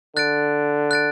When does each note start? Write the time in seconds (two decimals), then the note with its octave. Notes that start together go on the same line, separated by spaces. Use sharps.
0.16 D3 F#6 A6 D7
0.91 F#6 A6 D7